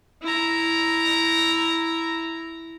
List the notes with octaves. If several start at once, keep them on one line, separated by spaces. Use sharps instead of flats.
E4 A#5